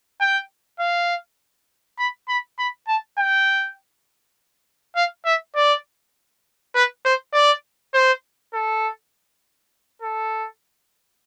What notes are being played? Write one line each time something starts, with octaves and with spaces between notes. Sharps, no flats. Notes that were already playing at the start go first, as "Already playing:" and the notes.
G5
F5
B5
B5
B5
A5
G5
F5
E5
D5
B4
C5
D5
C5
A4
A4